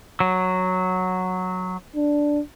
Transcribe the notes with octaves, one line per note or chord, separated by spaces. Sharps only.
F#3
D4